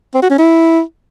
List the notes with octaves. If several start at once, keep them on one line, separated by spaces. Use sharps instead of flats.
C4
F#4
C#4
E4